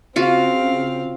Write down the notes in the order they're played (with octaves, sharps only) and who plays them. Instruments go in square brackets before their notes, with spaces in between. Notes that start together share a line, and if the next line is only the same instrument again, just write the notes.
[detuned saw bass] C#3 [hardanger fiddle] C4 F5 [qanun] F4 F#4